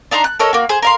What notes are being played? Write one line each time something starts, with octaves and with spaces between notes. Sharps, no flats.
D4 D#4 A#5 C6
F#6
A4 A#4 C#5 D#5
A#3 F#4
G#4 C5
A#4 F5 C6